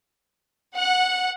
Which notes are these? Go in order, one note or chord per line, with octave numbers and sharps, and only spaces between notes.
F#5